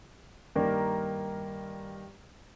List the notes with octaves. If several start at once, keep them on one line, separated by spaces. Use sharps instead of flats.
G2 D#3 A#3 A#4 D5